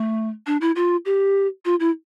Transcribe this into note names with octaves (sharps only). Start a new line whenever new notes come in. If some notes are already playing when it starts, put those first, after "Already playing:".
Already playing: A3
D4
E4
F4
G4
F4
E4